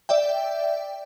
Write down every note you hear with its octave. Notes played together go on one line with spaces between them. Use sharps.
D5 E5 G5